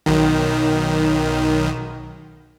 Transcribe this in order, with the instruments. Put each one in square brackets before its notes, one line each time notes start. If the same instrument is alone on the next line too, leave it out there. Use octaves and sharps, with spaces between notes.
[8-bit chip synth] B1 D#3